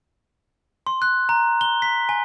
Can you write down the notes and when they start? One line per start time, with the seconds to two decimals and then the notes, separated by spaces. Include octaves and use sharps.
0.87 C6
1.02 F#6
1.29 A#5
1.61 G7
1.82 B6
2.09 G#5